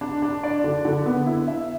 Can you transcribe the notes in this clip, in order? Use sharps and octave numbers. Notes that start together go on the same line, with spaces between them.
D4
D4
D5
D3
D3
B3
E4
E5